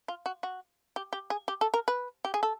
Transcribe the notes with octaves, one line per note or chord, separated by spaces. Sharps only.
F4
F#4
F#4
G4
G4
G#4
G4
A4
A#4
B4
G4
G#4
A4